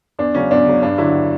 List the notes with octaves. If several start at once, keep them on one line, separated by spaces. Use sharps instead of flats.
E2 D4
C#3 F#3 C#4
E2 D4
C#3 F#3
G2 D4
D3 F#3 D4 E4